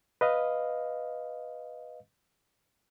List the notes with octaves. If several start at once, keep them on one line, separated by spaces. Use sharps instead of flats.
B4 D#5 F5